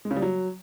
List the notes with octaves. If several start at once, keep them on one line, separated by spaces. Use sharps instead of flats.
G#3
C#3
G3
F#3